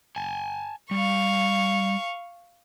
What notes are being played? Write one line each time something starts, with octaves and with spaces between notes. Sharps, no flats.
G#5 A5
G3 F5 C#6